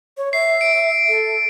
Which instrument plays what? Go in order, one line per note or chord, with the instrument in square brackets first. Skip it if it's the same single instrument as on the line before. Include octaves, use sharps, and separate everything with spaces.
[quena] C#5
[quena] E5 [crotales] C7
[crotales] D7
[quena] A4